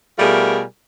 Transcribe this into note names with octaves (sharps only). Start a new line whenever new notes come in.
B2 G3 A3 F4 G#4 A#4